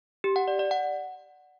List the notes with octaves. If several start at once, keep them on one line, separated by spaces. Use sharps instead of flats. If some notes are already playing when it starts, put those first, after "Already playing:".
G4
F#5
D5
D5
F#5